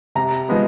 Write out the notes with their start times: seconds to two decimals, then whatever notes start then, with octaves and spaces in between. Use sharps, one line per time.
0.15 C3 A#5
0.49 F3 G#3 B3